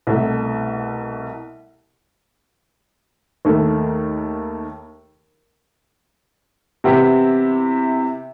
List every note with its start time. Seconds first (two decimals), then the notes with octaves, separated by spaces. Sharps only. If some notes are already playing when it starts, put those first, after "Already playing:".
0.07 C2 B2 A3
3.45 D#2 D#3 A3
6.84 C3 E3 B3 E4 G4